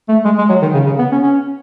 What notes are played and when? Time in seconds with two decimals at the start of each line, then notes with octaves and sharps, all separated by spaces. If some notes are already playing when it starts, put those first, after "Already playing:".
0.09 A3
0.25 G#3
0.38 G#3
0.49 F#3
0.62 D#3
0.74 C#3
0.86 C#3
0.99 B3
1.12 C#4
1.23 C#4